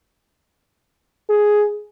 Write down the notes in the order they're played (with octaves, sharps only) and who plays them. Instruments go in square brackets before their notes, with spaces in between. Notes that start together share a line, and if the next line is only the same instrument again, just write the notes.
[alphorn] G#4